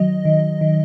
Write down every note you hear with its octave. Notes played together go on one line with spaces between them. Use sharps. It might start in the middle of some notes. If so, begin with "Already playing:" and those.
Already playing: D#3 F#3 D#5
D#3
D#3